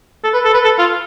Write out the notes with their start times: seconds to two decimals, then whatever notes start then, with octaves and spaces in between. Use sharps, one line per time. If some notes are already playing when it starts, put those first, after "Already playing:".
0.24 A4
0.34 B4
0.45 A4
0.54 B4
0.64 A4
0.79 F4